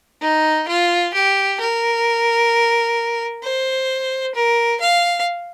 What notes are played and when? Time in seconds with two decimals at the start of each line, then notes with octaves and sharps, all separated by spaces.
0.21 D#4
0.68 F4
1.14 G4
1.60 A#4
3.43 C5
4.35 A#4
4.80 F5